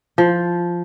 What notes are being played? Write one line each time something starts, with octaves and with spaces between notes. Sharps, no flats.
F3